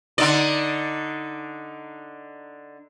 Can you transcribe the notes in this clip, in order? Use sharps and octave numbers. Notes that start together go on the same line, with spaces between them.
D3 D#4 D5